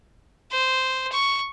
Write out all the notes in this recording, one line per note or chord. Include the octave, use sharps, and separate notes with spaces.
C5
C#6